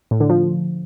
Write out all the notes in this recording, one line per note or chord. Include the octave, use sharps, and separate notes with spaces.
A2
D3
F3